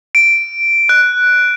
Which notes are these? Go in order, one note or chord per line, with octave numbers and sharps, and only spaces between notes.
D7
F#6